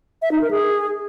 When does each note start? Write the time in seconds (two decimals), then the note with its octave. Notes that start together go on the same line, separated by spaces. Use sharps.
0.22 E5
0.32 D#4
0.41 A#4
0.51 G#4